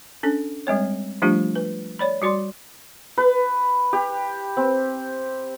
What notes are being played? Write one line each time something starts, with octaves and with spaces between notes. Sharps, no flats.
C#4 D4 A4
G3 G#3 C4 C#5
F3 G3 A3 D4 F4 G4
B4
C#5 D5 B5
G3 F#4 D5 C6
B4
G4
C4